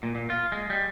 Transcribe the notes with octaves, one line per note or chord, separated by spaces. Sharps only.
A#2
A#2
F4
G#3
G3